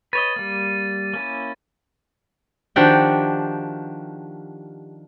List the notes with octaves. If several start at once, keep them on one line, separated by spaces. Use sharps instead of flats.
B4 C#5 D#5 A6 D#7
G3 A#3
A#3 C#4 E4
D#3 F3 D4 F#4 G4 G5